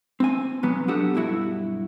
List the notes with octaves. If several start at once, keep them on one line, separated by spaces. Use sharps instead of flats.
C4 G#5
B1 F#3 B3
B3 D4 F#4 G4 A4
B1 G2 E4 F#4